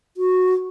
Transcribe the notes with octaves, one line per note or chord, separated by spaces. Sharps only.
F#4